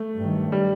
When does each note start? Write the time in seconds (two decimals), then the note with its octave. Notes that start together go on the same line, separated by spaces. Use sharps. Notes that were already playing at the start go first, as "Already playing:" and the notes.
Already playing: A3
0.17 G2 D#3 F#3
0.52 G3